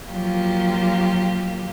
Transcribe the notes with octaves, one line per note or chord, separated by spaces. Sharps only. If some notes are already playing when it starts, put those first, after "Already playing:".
F3 F#3 A#3 F4 G4